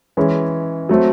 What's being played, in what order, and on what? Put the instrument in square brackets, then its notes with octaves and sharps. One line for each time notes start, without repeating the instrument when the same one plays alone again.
[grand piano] E3 G#3 C#4
F#3 A3 C4